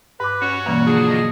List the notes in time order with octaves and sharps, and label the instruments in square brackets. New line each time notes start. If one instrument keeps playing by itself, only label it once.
[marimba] G2 D6 [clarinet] B4
[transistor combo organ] C#4 [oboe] F#4
[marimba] B2 E3 A#3 [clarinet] G3
[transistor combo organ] D3 F3 F#3 [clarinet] G#4
[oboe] D#5